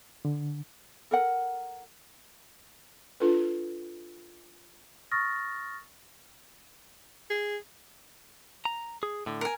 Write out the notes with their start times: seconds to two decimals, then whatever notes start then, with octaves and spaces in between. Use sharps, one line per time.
0.25 D3
1.11 A4 A#4 F#5
3.20 D4 F4 A4 B4
5.12 C#6 D#6 F6 A6 A#6
7.30 G#4
8.65 A#5
9.03 G#4
9.26 A2 D3
9.41 A#4 G#5